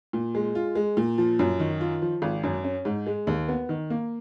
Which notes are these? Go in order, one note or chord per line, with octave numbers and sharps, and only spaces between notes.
A#2
G#3
F4
G#3
A#2
F3
F#2
D#3
F4
F3
G#1
F#2
C#4
G#2
G#3
D#2
B3
D#3
A#3